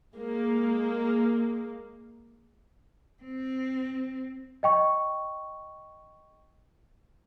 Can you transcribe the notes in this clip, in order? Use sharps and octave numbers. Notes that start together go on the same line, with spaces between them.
G#3 A#3
C4
D#5 G5 C#6